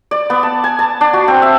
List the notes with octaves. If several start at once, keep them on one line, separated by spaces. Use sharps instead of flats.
D5
B3
A5
G#5
A5
D4
F#4
C4
E5